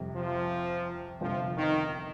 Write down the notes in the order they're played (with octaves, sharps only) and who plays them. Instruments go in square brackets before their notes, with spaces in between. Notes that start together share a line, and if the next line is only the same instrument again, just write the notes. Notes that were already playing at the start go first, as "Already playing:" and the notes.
Already playing: [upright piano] F2 C3 G3
[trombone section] F3
[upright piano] G1 F2 C3 G3 D4 [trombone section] F3
[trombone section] D#3